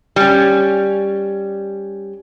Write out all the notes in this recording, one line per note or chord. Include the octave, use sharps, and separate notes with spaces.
G3 C#4